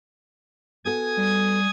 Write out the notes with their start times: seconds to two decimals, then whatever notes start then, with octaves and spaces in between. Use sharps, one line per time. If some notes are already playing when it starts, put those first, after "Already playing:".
0.85 B3 F#4 A4 G#5 D#6 G#6
1.17 G3